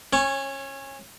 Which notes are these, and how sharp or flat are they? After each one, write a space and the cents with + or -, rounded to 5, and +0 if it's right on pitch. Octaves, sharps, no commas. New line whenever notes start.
C#4 -25 C#5 +0